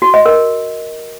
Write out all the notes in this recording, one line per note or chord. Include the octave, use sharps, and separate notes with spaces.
F#4
D#5
A#4